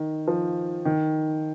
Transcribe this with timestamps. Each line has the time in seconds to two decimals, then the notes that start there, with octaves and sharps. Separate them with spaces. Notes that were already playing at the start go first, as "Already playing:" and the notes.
Already playing: D#3
0.27 F3
0.85 D#3